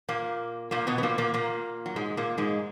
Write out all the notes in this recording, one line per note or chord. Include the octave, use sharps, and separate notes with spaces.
A#2 A#3
A#2 A#3
B2 B3
B3
A#2 A#3
A#2 A#3
A#2 A#3
F#3
G#2 G#3
A#2 A#3
G#2 G#3